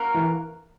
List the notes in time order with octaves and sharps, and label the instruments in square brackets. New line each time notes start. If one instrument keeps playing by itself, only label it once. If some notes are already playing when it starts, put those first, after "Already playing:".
Already playing: [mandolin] A#3 C#4 F#4 A#4
[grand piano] E3